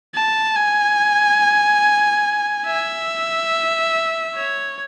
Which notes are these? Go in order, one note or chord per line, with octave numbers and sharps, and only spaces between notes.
A5
G#5
E5
C#5